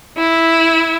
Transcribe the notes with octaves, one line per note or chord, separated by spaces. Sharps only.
E4